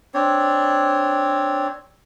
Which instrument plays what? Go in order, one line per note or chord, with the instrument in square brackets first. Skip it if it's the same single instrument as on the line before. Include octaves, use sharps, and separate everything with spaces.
[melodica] C4 D4 C#5